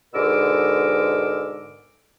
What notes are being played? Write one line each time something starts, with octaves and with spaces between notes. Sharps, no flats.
G#2 B2 D3 A#4 D6 E6